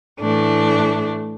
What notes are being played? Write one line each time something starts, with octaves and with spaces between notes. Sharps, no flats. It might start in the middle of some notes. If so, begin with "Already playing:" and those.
A2 E3 A3 D4